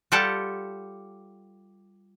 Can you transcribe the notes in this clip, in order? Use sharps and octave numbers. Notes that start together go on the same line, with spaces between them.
G3 F4 G4 A4 F#5 A5